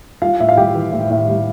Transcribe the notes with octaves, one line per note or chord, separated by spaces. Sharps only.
G3 F4 F5
A2 E5
F5
G3 G4 G5
E3
A2
A2
G3